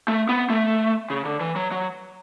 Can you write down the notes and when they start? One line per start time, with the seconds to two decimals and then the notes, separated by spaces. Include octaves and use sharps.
0.08 A3
0.29 B3
0.50 A3
1.10 C#3
1.25 D3
1.40 E3
1.56 F#3
1.71 F#3